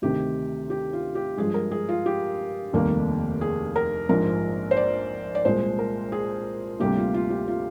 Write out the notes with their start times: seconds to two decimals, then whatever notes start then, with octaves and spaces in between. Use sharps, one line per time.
0.02 D2 C3 D#3 G4
0.70 G4
0.93 F4
1.15 G4
1.37 G2 F3 G#3 G#4
1.54 A#4
1.71 G#4
1.89 F4
2.06 G4
2.73 F1 D#2 D#3 G3 A#3
3.41 G#4
3.76 A#4
4.09 A#1 G#2 F3 A#4
4.71 C5
4.77 D5
5.35 D5
5.45 C2 A#2 G#3 C5
5.79 A#4
6.12 G#4
6.80 D2 C3 G3 A#3 G4
6.97 F4
7.14 F4
7.30 G4
7.48 F4